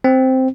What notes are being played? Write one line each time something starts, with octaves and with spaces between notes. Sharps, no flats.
C4